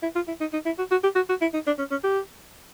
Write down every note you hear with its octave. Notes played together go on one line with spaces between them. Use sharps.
E4
F4
E4
D#4
D#4
E4
F#4
F#4
G4
F#4
F#4
E4
D#4
D4
C#4
C#4
G4